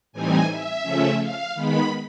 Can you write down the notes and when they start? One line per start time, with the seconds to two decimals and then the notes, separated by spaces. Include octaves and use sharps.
0.12 A2 E3 G3 C4 D#4 G#5
0.48 E5
0.83 C#3 F3 A3 C#4
1.19 F5
1.54 D#3 G#3 B3 B5